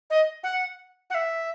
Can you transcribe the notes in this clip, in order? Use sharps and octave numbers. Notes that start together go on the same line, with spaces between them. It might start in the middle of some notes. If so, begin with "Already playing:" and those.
D#5
F#5
F#5
E5